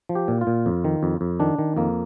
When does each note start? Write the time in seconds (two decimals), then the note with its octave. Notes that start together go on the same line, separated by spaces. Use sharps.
0.09 F3
0.15 G4
0.28 A#2
0.41 F4
0.47 A#2
0.66 F2
0.84 D#3
1.03 F2
1.21 F2
1.40 D#3 D4
1.58 D#3
1.77 F2 A#3